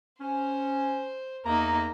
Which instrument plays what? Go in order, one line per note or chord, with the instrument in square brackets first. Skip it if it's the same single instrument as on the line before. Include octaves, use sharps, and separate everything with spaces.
[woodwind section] C#4 [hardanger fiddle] C5
[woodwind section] E2 E5 A#5 [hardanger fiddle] A#3 D#4